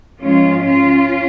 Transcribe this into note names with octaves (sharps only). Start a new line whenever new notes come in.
G#2 F3 G#3 C#4 F4
C#4 F4